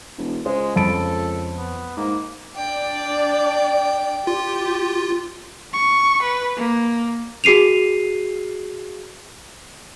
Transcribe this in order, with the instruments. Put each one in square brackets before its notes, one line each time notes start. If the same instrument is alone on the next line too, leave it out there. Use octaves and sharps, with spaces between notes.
[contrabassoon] E1
[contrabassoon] C#2 [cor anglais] G#3 [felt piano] C5
[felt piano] F2 B5 D7 [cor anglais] A4
[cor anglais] B3
[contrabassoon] G#2 [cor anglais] A#3
[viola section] D4 D5 [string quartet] G5
[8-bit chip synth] F4 [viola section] G4
[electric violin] C#6
B4
A#3
[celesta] F#4 G#4 C7 D#7 F7